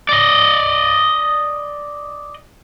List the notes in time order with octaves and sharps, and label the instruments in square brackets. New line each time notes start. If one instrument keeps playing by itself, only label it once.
[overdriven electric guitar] D5 D#5